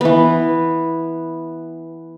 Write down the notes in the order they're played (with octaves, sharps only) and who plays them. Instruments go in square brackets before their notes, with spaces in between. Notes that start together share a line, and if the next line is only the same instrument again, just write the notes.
[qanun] E3 B3